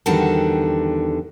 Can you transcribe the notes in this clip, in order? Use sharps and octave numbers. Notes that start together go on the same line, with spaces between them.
E2 D3 D#3 G3 F#4 A5